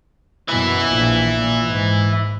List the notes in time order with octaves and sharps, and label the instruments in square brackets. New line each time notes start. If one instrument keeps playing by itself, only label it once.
[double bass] F#2 B2 [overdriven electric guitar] E3 E4
[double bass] A#1
A#2
G#2